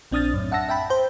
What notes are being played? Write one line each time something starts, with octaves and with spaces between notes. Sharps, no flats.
A#1 C4 D4 D#6 F6 A6
F#2 A2
E5 F#5 A5 E6 A#6
E5 G5 A5 B5
C5 G5